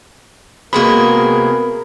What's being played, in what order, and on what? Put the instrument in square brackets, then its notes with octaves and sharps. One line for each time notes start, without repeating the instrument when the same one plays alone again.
[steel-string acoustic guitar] C3 G#3 A#3 [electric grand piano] B3 F#4 G#4 [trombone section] A#4 [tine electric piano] B5